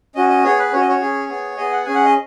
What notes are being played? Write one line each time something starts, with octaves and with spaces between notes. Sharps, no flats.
C#4 F#4 D#5
D#5
B3 G#4 C#5
B4
C#4 F#4 C#5
D#5
C#5
C#4 G#4
B3 G#4
B3 G#4 D#5
F#5
C#4 G#4 G#5
F#5
D#5